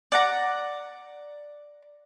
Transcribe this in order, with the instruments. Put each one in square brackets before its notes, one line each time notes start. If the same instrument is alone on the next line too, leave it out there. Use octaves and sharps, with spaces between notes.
[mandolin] D5 F#5 A#5